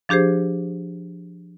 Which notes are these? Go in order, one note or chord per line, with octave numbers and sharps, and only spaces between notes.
F3 D4 G4 G#4 C5